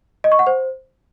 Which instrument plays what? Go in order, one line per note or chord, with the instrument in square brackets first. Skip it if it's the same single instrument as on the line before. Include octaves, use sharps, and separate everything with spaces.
[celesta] D#5
C#6
F#5
C5